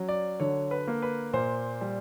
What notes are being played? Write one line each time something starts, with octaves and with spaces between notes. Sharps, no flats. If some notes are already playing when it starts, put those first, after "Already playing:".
Already playing: F#3 C#4
D5
D3 C#5
B4
A#3
B4
A#2 C5
G3